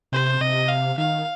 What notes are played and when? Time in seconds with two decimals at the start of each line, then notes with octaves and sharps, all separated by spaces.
0.12 C3 C5
0.41 C3 D#5
0.69 F5
0.98 D#3 F5